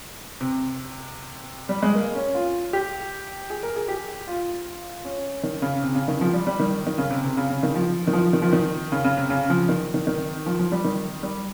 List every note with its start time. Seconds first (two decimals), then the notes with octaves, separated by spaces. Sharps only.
0.41 C3
1.69 G3
1.83 G#3
1.95 A#3
2.15 C#4
2.35 F4
2.73 G4
3.50 G#4
3.63 A#4
3.76 G#4
3.88 G4
4.27 F4
5.04 C#4
5.43 D#3
5.62 C#3
5.82 C3
5.95 C#3
6.08 D#3
6.21 F3
6.33 G3
6.47 G3
6.59 D#3
6.87 D#3
6.98 C#3
7.11 C3
7.24 C3
7.37 C#3
7.50 C#3
7.63 D#3
7.75 F3
8.07 D#3
8.13 F3
8.33 D#3
8.42 F3
8.53 D#3
8.92 C#3
9.04 C#3
9.17 C3
9.30 C#3
9.50 F3
9.69 D#3
9.94 D#3
10.07 D#3
10.46 F3
10.59 F3
10.72 G3
10.84 D#3
11.23 G3